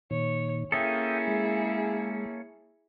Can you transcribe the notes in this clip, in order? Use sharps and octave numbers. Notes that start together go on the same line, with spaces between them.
A#2 D#3 C#5
A#3 C#4 E4 G#4 A4 E5 G5 D#6
G#3